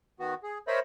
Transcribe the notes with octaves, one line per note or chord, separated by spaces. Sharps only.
D#3 B3 F#4
G#4
A#4 C5 C#5 D#5 E5 B5